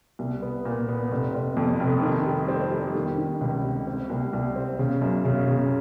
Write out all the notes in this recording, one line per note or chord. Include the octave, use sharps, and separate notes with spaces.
C2
B3
A#2
B3
F1
F1
F2
F1
D#3
G3
C4
G3
D#3
D#3
C#2
C3
C4
C2
C2
C4
C#3
F#2
C#3
C#3